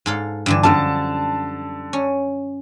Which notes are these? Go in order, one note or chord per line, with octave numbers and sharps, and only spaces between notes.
G#2 A4 F5
G2 D3 E3
F#2 D3 F3 G3 A5
C#4